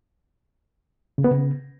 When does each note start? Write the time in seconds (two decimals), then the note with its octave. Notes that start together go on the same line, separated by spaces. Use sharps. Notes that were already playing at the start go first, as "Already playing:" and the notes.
1.18 C#3
1.24 B3
1.31 C#3